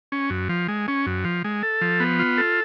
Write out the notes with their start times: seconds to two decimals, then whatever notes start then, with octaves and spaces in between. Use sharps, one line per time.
0.12 C#4
0.30 F#2
0.49 F3
0.68 G#3
0.88 C#4
1.06 F#2
1.24 F3
1.44 G#3
1.63 A4
1.81 F3
2.00 B3
2.19 F4
2.38 A4